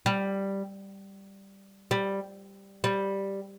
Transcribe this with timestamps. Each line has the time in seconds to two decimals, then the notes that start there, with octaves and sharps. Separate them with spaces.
0.06 G3
1.91 G3
2.84 G3